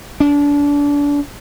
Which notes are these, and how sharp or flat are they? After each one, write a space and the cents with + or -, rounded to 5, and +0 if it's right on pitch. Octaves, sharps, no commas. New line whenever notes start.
D4 -30